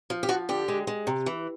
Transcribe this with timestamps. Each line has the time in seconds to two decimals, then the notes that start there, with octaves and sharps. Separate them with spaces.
0.10 F3
0.23 G4
0.29 F3 F#4
0.49 D3 G4
0.68 G#3
0.87 G#3
1.07 C3
1.26 E3